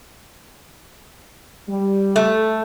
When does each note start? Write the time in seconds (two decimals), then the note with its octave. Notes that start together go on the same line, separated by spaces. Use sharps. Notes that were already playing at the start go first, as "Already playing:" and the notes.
1.69 G3
2.16 A3